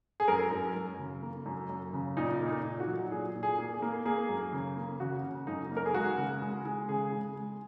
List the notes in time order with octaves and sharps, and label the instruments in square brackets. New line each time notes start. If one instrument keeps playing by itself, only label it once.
[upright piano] G#4
F#2 A#4
F#2
F#2
C#3
A#3
F#2
F#2
C#3
A#2 D#4
A#3
D#4
A#2
F#4
F#3
A#2 G#4
A#2
G#4
A#3
G#4
A#3
A#3 G#4
F#2
C#3
A#3
C#3 F#4
C#3
F#2 D#4
A#3
A#4
G#4
G#3 F#4
C#3
G#3
G#3
C#3 G#4
G#3
G#3